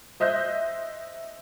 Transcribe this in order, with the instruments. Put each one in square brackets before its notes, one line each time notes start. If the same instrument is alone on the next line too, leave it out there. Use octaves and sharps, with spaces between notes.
[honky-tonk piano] C5 D#5 E5 F#6 G6